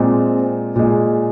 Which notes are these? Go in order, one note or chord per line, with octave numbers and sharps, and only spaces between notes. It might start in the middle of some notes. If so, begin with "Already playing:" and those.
Already playing: A#2 G#3 C4
A#2 G#3